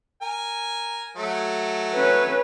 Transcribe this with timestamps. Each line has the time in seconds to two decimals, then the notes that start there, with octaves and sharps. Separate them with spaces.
0.22 A#4 G#5
1.16 F#3 A3
1.94 C#4 B4